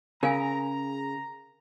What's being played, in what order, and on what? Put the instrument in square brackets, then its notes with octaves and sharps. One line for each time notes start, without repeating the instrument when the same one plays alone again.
[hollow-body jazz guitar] C#3 G#4 [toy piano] A#4 F5 G#5 [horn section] A#5